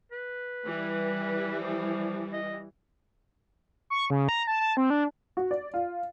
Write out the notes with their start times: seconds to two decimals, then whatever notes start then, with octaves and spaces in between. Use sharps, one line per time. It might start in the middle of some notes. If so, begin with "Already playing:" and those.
0.12 B4
0.65 E3 G3
1.60 F3
2.33 D#5
3.90 C#6
4.10 C#3
4.29 A#5
4.47 A5
4.60 A5
4.77 C4
4.90 D4
5.37 F#4
5.51 D5
5.74 F4